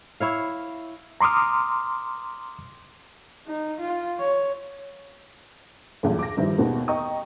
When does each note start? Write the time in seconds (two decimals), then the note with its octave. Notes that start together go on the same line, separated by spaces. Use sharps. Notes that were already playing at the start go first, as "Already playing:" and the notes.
0.20 E4 C#5 F5
1.21 A#5 C6 D6 D#6 F6
3.47 D#4
3.80 F4
4.19 C#5
6.03 B1 E2 G2 A#2
6.19 D6 A#6
6.37 G2 D#3 F3 G3 E4
6.58 D#2 B2 D#3 G#3 A#3
6.88 D#5 G5 A#5 C#6 D#6